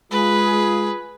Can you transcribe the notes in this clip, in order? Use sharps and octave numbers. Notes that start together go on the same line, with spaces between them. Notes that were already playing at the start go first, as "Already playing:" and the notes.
G#3 F4 G#4 B4